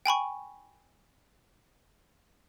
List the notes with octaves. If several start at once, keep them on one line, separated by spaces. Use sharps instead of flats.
G5 G#5 B5 C#6